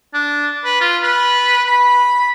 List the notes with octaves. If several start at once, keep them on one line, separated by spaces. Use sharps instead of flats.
D4
B4
F4
B4
B5